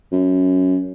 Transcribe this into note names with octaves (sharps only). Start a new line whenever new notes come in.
F#2